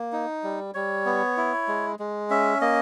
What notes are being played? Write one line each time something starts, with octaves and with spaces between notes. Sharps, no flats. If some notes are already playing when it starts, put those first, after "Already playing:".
Already playing: A#3
D#4
G3
G3 C#5
B3
E4
G#3
G#3
C#4 E5
A#3 D#5